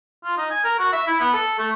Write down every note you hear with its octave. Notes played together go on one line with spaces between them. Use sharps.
F4
D#4
G#5
A#4
F#4
E5
E4
B3
A4
A3